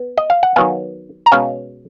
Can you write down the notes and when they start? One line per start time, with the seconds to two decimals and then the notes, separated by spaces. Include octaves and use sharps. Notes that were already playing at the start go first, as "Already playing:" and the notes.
Already playing: B3
0.18 D#5
0.30 F5
0.43 F#5
0.56 D#3 F#3 B3 F5 G#5
1.26 A#5
1.32 B2 G#3 C#4 F5 G#5